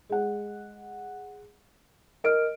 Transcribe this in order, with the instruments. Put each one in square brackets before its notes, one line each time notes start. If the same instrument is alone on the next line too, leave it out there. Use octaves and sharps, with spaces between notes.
[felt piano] G#3 F#5
[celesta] A#4 F6 [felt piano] D#5 D7